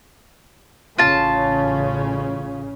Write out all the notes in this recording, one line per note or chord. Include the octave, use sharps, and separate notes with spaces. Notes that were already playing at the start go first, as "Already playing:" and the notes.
A1 C#3 C#4 F4 A5